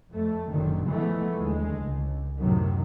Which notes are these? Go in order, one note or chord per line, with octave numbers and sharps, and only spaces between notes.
F2 A3
F#1 A#2 D3 D#3
E3 F3 G#3 A3 B3
D#2 D3 G#3
C#2
F#2 A2 C3 D#3 F#3